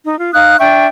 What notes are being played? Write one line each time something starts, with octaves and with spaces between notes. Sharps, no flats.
D#4
F4
D#4 F5 D#6 F#6
D4 E5 G5 C#6